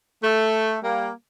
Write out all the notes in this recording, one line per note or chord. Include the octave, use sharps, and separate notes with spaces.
A3
G3 A#3